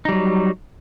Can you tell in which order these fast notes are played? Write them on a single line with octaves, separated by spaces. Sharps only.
D#4 G3 F#3